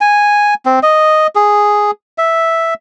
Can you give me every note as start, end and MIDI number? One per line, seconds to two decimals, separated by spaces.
0.01 0.54 80
0.65 0.79 60
0.83 1.27 75
1.35 1.91 68
2.18 2.74 76